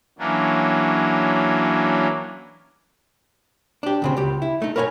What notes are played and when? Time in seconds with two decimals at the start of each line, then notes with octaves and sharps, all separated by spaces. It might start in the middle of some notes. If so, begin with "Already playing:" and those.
0.19 E3 F#3 A#3 C#4 D4
3.83 D4 G4
4.02 D2 C#3 C4
4.17 C#2 G4
4.42 E4
4.62 A3 D#4
4.76 A#4 B4 C#5 F#5 G#5